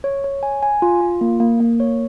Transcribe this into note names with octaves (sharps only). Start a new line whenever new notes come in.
C#5
C#5
G#5
G#5
F4
F4
A#3
A#3
A#3
C#5